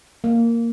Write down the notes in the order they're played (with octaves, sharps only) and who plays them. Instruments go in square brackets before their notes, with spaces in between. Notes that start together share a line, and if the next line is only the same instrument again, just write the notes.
[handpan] A#3